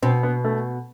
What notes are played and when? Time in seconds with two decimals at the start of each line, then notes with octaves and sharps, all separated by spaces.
0.02 B2 C4
0.23 B3
0.44 A3